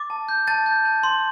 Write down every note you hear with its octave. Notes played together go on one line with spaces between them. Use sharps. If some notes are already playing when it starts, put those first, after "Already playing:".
Already playing: D6 A6
A5
G6
A5 A6
G6
A5
C6